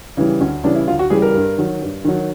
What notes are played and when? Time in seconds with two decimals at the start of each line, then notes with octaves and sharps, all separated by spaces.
0.17 C#3 E3 G3
0.40 D2 C#4
0.64 C#3 E3 G3 D4
0.75 E4
0.88 D2 F4
0.99 F#4
1.10 C#3 E3 G3 G#4
1.22 A#4
1.34 G2
1.58 D#3 F#3
1.81 G2
2.05 D#3 F#3